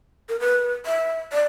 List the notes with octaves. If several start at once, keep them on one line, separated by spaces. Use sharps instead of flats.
A#4
B4
E5
D5